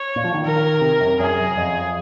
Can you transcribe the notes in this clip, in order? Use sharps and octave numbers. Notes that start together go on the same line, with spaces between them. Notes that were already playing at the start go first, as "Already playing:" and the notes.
Already playing: C#5
A#2
F3
D#3
A#4
C3
F#2
F#2 G#4
F2